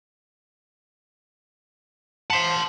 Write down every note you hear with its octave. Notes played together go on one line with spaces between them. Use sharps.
C5 E5 F#5 A5 C6